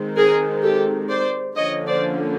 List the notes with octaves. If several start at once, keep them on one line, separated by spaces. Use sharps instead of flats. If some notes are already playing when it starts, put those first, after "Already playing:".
Already playing: D#3 G#3 C4
G#4 A#4
G4 A4
C5 D5
D3 F3 A#3 C#4 C#5 D#5
C5 D5